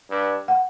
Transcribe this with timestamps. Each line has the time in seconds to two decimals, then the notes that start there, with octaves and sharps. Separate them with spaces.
0.10 G2
0.48 F#5